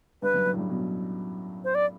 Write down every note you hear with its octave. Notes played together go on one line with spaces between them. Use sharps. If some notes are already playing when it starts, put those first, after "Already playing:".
G2 B4
F#2
F#2
A2
G2
B2
C5
D5